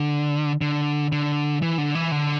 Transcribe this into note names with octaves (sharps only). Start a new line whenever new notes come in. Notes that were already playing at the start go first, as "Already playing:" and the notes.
Already playing: D3
D3
D3
E3
D3
E3
D3